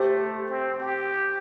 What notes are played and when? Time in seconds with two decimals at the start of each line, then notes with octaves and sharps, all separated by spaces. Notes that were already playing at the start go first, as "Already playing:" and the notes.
Already playing: A3 G4 C5
0.49 C4
0.80 G4